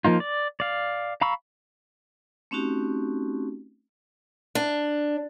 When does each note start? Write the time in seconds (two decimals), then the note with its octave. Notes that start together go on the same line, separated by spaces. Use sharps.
0.05 F3 A#3 D#4 F4
0.20 D5
0.60 D5 F5
1.21 F5 A#5 B5 C#6 E6
2.51 A3 C4 C#4 D#4 F#4 G4
4.55 D4